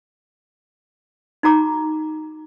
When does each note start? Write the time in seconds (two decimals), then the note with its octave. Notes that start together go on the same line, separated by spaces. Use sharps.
1.43 D#4 F#4 A#5 D6